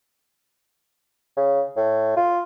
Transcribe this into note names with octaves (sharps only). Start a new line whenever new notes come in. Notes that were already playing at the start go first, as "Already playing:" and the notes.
C#3
A2
F4